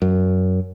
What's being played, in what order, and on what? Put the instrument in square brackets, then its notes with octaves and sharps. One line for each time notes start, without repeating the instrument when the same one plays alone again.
[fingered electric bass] F#2